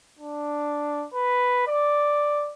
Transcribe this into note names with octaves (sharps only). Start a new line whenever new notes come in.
D4
B4
D5